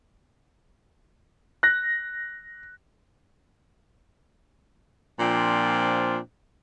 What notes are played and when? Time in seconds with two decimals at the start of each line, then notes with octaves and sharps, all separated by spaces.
1.63 F#6 A#6
5.20 A#2 F3 C4 D4 F4